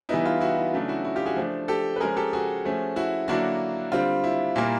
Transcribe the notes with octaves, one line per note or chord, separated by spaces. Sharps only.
E3 G3 B3 D#4 E4
F4
E4 F#4
E4
C#3 F#3 A3 D4
E4 F#4
E4 F#4
F4 G4
F#4 G#4
F3 A3 D4
G4 A4
B4
F3 G#3 C#4 G#4 A#4
G4 A4
F#4 G#4
F3 A3 C#4
E4 F#4
D3 F#3 A#3 D4 E4 F#4
D3 G3 C4 F4
E4
A#2 G3 A#3